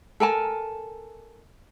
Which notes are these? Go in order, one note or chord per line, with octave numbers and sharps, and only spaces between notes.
A4 A#4 G#5 A5